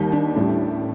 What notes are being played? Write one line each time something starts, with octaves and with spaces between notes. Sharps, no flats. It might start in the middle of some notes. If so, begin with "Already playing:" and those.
Already playing: D#2 D#3 G3 D#4
D4
A1 A2 G3